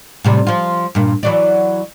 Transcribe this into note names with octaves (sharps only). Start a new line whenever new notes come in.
A2 C3 G3
F3 F4
G2 A#2
E3 F#3 D5